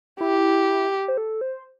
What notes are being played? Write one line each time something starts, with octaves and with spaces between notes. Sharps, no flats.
E4 G4
C5
A4
C5